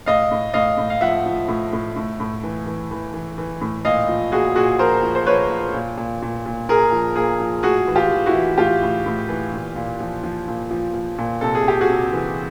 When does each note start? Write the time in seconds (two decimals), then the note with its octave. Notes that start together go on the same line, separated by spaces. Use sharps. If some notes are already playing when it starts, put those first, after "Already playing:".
0.06 A2 D#5 F5
0.31 A2
0.54 A2 D#5 F5
0.77 A2
0.90 F5
1.01 F3 E5 F#5
1.26 F3
1.48 A2
1.73 A2
1.96 A2
2.20 A2
2.43 E3
2.66 E3
2.91 E3
3.14 E3
3.38 E3
3.61 A2
3.85 A#2 D#5 F5
4.09 F3
4.32 A#2 F#4 G#4
4.56 A#2 F#4 G#4
4.79 F3 A#4 C5
5.03 F3
5.15 C5
5.27 F3 B4 C#5
5.50 F3
5.74 A#2
5.97 A#2
6.22 A#2
6.46 A#2
6.69 A#2 G#4 A#4
6.92 F3
7.16 A#2 G#4 A#4
7.40 F3
7.63 A2 F#4 G#4
7.87 E3
7.95 F4 G4
8.11 E3
8.26 E4 F#4
8.34 E3
8.57 A2 F4 G4
8.82 A2
9.06 A2
9.29 E3
9.53 A#2
9.76 A#2
10.01 F3
10.23 F3
10.48 A#2
10.71 F3
10.94 F3
11.18 A#2
11.41 C3 A4
11.55 G#4
11.65 C3 G4
11.81 F#4 G#4
11.89 C3
12.13 E3